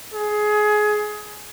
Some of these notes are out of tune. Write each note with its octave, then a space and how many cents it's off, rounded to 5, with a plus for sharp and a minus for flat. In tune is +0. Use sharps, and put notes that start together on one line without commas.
G#4 +20